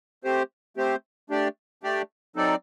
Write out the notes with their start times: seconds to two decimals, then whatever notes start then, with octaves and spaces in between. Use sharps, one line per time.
0.24 A3 C4 G4 C5
0.77 A3 C4 G4 C5
1.30 A3 D4 G4 D5
1.83 A3 D4 G4 D5
2.36 F#3 C4 D#4 A4 D5